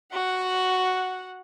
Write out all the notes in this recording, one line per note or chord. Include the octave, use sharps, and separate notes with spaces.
F#4 F#5